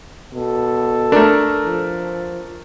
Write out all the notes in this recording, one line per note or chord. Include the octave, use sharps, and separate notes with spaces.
B2 A4
A3 D4 A#4
F3